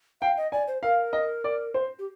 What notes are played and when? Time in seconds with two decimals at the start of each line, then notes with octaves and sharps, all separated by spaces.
0.21 F5 G5
0.37 D#5
0.52 D5 G#5
0.68 C5
0.83 A#4 F5
1.13 D#5
1.44 D5
1.74 C5
1.99 G4